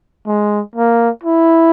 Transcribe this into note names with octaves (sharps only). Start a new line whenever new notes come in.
G#3
A#3
E4